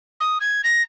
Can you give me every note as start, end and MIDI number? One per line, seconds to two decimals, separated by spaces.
0.20 0.38 87
0.41 0.62 92
0.64 0.82 94